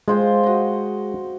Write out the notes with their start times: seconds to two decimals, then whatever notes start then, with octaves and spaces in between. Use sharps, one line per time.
0.08 G#3 F4 C5 G5
0.44 F#4 D#5